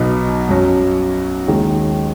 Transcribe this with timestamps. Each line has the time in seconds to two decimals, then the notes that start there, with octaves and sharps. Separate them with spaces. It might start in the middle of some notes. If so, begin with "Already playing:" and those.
Already playing: B1 B2 B3 D#4
0.49 F#2 F#3 C#4
1.48 D#2 D#3 G#3